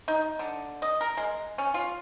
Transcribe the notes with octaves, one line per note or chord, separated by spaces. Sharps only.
D#4
D3
D#5
A#4
G#3
C#4
F4